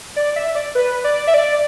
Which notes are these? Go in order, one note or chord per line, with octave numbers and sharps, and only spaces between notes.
D5
E5
D5
B4
D5
E5
D5